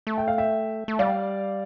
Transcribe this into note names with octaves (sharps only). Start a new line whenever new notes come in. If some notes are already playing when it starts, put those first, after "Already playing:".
A3
G5
F5
E5 G5
A3
G3 D5 F5